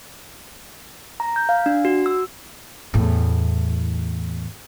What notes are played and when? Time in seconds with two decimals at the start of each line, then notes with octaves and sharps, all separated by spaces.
1.20 A#5
1.36 G6
1.49 F5
1.66 D4
1.85 F#4
2.06 E6
2.94 E2 A2